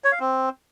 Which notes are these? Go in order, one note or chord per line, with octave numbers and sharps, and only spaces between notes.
C#5
F5
C4